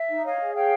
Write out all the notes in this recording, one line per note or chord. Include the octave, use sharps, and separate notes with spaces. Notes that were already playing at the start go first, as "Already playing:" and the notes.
Already playing: E5
D#4
C#5 D#5 F5
G#4
C#5 F5 G5